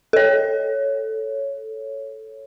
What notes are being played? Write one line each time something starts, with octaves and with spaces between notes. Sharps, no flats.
A4 C#5